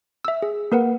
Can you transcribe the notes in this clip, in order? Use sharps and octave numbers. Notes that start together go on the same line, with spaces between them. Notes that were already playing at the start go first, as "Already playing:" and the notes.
E5 E6
G#4
A#3 A#4 B4 F#5